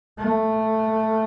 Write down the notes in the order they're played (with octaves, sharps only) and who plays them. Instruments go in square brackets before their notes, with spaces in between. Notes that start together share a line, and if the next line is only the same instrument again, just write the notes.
[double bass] A3